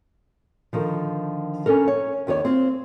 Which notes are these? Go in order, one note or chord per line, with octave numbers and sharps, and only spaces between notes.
D3 D#3 F3
C#4 D4 A4 A#4
C#5
D#2 D#3 A#4 C#5 D5
C4 F4